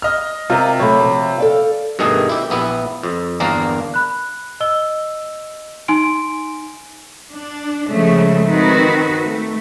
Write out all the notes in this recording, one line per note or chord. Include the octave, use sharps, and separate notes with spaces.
D#5 F6
C3 F4 A#4 D#5
F#3 A3 C#5 B5
F3
A4 D5 F5
G2 B2 D#3 A3 G#4
E4 G4
A#1 B3 E4
F2
G1 E2 A#3 D4 A#4 F5
B5 F#6
D#5 E6 G7
D#4 G#5 C6 D7
D4
C#3 F3 G#3 A3
D#3 C4 F#4 B4
A3